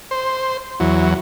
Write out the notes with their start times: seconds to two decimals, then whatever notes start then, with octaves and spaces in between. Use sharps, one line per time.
0.11 C5
0.80 E2 F#3